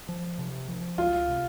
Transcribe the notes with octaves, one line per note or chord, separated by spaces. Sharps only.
F3
C3
F3
C#2 F4
C3